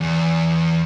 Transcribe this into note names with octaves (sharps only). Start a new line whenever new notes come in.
E2